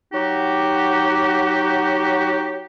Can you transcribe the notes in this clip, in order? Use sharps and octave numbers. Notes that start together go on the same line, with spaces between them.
F#3 D#4 F#4 G4